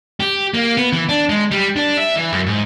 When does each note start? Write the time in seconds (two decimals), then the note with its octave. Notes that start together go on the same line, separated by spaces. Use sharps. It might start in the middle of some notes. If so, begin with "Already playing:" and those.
0.20 G4
0.54 A#3
0.77 B3
0.93 E3
1.09 D4
1.29 G#3
1.51 G3
1.76 D4
1.97 E5
2.16 E3
2.32 F#2
2.47 G#2